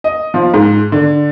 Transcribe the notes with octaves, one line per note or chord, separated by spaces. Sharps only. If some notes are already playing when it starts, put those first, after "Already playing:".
D#5
F3
G#2
D3